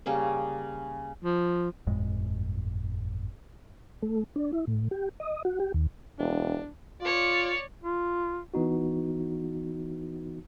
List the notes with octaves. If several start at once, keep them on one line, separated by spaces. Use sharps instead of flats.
C#3 G3 A#3 C#4
F3
G1 F2 A2 G#3
A3
D4
E4
A2
G4
D#5
F#4
G4
D#2
E1 D4
F4 C#5 D5
F4
E3 B3 D#4 F#4